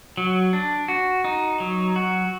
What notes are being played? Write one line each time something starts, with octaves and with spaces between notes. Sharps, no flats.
F#3
D4
F#4
D#4
F#3
F#4